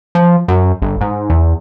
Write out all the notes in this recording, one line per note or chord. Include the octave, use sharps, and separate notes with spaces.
F3
F#2
G1
G#2
E2